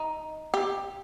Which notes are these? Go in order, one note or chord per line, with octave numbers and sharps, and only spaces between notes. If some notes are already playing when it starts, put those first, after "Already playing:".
Already playing: D#4
G4